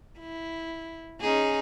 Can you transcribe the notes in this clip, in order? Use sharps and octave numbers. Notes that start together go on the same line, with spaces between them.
E4
C#4 D#4 G#4